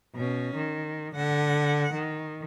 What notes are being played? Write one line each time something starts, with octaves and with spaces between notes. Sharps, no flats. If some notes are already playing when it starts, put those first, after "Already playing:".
B2 C#4
D#3
D3 F#5
D#3